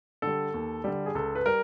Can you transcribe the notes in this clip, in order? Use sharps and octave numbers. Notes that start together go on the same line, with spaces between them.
D3 G3 A4
D#2
D3 G3
G#4
C#2 A4
B4
G3 A#4